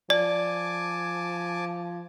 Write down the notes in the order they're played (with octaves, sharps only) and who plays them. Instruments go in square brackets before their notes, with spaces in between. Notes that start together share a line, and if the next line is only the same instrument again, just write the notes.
[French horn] F3 [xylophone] D5 [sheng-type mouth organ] G#5 A5 D6